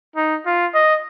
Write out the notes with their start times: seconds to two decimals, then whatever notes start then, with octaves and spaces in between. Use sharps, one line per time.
0.16 D#4
0.46 F4
0.74 D#5